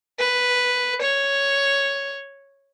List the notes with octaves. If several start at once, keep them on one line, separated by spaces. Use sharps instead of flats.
B4
C#5